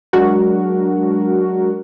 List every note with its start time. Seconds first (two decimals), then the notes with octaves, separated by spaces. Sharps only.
0.13 F#3 G#3 D4 F#4 A#4